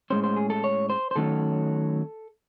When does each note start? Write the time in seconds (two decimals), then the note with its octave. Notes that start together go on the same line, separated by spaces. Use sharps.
0.10 A2 G#3 C#4 C5
0.24 C5
0.36 G#4
0.50 A4
0.64 C#5
0.90 C5
1.11 C5
1.16 D#3 F#3 A3 C#4 A4